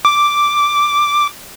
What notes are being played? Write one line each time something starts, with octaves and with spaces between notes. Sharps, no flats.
D6